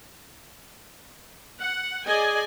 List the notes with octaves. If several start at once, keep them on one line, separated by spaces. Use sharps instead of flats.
F#5
G#4 D5 D#5 G#5